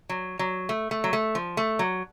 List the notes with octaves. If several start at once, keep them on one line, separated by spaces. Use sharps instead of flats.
F#3
F#3
A3
A3
F#3
A3
F3
A3
F#3